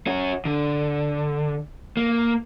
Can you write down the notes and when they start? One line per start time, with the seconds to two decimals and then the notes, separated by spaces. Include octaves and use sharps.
0.07 C#4 F#4
0.45 D3
1.97 A#3